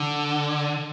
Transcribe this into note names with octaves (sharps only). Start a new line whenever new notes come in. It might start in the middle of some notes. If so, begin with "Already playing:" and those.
Already playing: D3